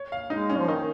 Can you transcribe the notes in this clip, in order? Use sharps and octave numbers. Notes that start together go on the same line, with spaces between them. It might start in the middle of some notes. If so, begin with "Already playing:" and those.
Already playing: C#5
F5
G#3 D#4
C#4
F3
D#3 D#4